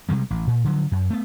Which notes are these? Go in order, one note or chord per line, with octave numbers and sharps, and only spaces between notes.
C3 D#3 G3 G#3
A1
A#2
D3 F3 F#3
F#2
A3 B3